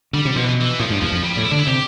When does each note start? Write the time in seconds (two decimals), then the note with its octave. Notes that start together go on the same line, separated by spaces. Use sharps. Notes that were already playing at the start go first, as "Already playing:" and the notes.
0.13 D3 G3
0.25 C3
0.36 B2 F3
0.44 E3
0.60 E3
0.79 A2 F3
0.90 G2
1.01 E2 F3
1.12 F2
1.23 G3
1.37 A2
1.44 E4
1.51 D3 D4
1.59 E4
1.67 C3 G4